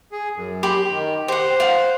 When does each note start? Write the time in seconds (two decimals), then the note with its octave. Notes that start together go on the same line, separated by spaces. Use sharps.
0.12 G#4
0.36 F#2
0.63 G4 B5 C6
0.90 D#3
1.28 G4 C5 F#5
1.60 F5 F#5